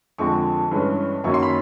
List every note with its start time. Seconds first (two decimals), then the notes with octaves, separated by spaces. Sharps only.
0.18 F2 D3 F3 G#3 C4 C#6
0.71 G2 E3 G#3 C#4
1.24 F#2 D#3 F#3 A#3 C#4 C#6
1.34 C6
1.43 B5